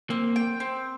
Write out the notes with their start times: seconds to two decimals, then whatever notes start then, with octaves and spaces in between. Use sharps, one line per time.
0.10 A#3 C4
0.36 G5
0.60 C4